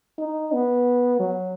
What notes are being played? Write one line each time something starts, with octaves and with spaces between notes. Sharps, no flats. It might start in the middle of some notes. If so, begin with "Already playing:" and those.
D#4
B3
F#3